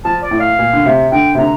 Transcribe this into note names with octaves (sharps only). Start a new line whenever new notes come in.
F3 A5
D5
A2
F5
A#2
D3
C3
D3 G5
C3
D3 A#5